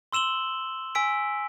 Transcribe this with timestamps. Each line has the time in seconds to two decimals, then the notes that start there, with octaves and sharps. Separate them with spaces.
0.13 C6 E6 E7 F#7 G7
0.95 G#5 E6 B6 D7